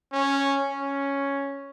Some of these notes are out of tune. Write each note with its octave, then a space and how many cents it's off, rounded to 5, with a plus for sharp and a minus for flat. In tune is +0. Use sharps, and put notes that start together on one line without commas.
C#4 -5
C#4 +0